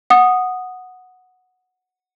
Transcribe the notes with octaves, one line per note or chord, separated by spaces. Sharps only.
F#5 D#6